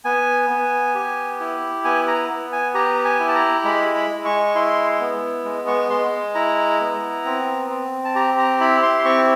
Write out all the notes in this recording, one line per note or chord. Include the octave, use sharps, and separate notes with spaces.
B3 G#5
B3
G4
E4
B3 G#5
A#5
B3
G#5
G4 A#5
G#5
E4
A5
A#5
G#3 B5
B5
G#3
C#6
C#6
E4 C6
B3
G#3
C#6
G#3 C6
E4 A#5
B3
C4
C4
A5
G4 A#5
A#5
E4 B5
C6
C4 C#6